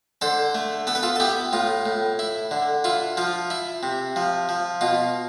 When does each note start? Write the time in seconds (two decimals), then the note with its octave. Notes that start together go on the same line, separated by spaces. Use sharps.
0.21 D3 A4 C5
0.55 A3
0.87 B3 A4
0.95 B4
1.03 F4 A4
1.16 A4
1.20 B3 E4 G4
1.53 A2 F4
1.86 A2
2.19 E4
2.51 D3
2.84 E4 F4
3.17 F3 F4
3.50 E4
3.83 C3
4.16 F3
4.49 F3
4.81 B2 F4